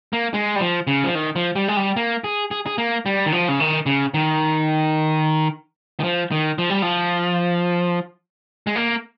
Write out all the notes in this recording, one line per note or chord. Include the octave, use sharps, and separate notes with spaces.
A#3
G#3
G3
F3
C#3
F3
D#3
F3
G3
G#3
G3
A#3
G#4
G#4
G#4
A#3
G3
D#3
F3
C#3
D#3
C#3
D#3
D#3
F3
D#3
F3
G3
F3
G#3
A#3